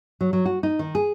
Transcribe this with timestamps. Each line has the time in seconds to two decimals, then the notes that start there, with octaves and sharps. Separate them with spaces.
0.21 F#3
0.33 F#3
0.45 F#4
0.63 D#4
0.79 D#3
0.95 G#4